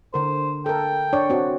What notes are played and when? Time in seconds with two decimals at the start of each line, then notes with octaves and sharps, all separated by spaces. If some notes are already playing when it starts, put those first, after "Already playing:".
0.14 D3 A#4 C5
0.66 A4 A#4 G5
1.13 D4 C#5 D5
1.30 C4 F#4